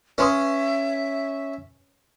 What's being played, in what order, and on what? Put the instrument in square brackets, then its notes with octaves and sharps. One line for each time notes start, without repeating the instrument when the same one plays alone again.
[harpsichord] C#4 [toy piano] B4 C6 D#6 [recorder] E5